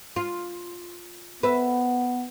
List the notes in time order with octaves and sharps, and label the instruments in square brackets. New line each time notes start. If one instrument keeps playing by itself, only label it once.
[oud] F4
[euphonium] B3 [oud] B4 E5